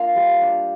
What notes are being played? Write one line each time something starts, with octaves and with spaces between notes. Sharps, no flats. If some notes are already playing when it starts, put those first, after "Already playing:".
Already playing: A#3 D4 F4 F5 C6
G3
D4